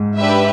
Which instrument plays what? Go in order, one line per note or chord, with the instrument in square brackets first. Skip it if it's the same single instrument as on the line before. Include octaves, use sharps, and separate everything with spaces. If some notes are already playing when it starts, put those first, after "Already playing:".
Already playing: [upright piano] G#2
[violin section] D4 G4 B4 E5